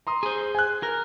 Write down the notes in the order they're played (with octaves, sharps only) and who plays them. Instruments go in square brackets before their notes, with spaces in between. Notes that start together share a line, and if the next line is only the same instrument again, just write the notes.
[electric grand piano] A#5 C6 D#6
[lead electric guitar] G#4 C5
[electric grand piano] G#5 F#6
[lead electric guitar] A#4